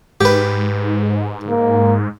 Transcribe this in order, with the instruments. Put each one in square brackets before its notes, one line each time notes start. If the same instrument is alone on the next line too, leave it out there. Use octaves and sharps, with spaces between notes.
[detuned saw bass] G#2 [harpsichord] G4 B4
[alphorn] A#3